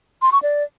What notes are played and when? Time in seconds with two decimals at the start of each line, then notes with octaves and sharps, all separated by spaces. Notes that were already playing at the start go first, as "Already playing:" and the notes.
0.22 C6
0.32 C#6
0.43 D5